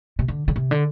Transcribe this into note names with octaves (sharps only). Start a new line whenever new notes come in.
C3
D3
D3
C3
D3